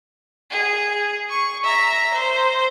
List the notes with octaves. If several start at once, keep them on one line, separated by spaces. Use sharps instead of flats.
G#4
C#6
E5 A#5
C5